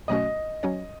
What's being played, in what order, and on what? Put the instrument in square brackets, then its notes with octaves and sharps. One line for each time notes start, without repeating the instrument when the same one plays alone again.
[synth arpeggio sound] B2 F#3 A3 C#4 F#4 [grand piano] D#5
[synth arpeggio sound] F#3 C#4 F#4 C#5